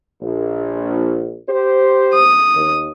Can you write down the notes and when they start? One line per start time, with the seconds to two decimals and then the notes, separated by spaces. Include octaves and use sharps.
0.22 A#1
1.48 G4 C5
2.14 D#6
2.54 D#2